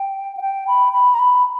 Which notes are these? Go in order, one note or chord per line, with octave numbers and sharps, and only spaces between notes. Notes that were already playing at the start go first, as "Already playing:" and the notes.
Already playing: G5
F#5
G5
B5
B5
A#5
B5